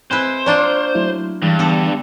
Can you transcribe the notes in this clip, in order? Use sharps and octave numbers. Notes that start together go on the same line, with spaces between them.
G#3 C4 E4 B4 C5
A#3 D4 F4 C#5 D5 C#6 G6
F#3 A3 E4
G2 E3 G3 G#3
D3 B3 A4